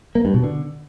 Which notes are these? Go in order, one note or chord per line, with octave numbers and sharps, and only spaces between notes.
A#3
G2
B2
D3